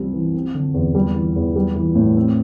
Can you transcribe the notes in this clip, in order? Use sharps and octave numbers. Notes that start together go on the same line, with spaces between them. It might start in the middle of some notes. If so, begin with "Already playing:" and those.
Already playing: C2 G3 C4
E3
C4
D3
E2
G3
E3
E2
G3
E3
A2
C4